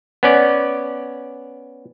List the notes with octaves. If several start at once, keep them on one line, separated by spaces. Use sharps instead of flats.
B3 C#4 D5